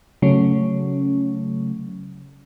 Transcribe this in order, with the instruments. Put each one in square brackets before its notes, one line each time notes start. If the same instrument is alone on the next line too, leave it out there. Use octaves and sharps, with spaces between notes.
[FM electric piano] C#3 F#3 A3 C#4